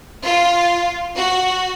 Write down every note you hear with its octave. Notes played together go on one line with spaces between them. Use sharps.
F4
F#4